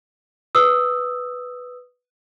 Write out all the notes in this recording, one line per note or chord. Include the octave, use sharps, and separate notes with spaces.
B4 D#6 E6